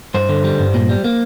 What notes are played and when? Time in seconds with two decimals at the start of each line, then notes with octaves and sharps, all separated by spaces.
0.14 G2 C5
0.29 D3
0.44 G3
0.59 G2
0.74 A#2
0.89 G3
1.04 A#3